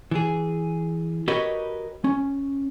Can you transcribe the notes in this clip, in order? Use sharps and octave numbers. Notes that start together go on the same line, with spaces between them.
E3 G#4
F#4 G4 A#4 B4 C#5 D#5
C#4